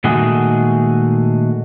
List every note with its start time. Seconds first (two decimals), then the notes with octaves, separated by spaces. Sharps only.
0.04 A#2 D#3 G#3 A3 F#4 G#4